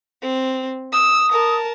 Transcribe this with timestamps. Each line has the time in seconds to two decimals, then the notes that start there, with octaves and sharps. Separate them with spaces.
0.22 C4
0.92 D#6 E6
1.32 A#4 A5